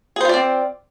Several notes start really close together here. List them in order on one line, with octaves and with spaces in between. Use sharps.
G#4 C5 F4 D5 C4